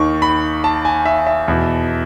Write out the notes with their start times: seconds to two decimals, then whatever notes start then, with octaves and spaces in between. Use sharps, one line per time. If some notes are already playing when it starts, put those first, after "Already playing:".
Already playing: D#2 D#3 C#6
0.22 B5
0.64 A5
0.85 G#5
1.05 E5
1.27 E5
1.48 E2 B2